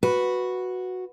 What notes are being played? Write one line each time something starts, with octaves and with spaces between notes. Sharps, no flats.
F#4 B4